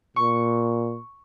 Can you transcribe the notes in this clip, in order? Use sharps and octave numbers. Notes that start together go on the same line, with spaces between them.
A#2 C#6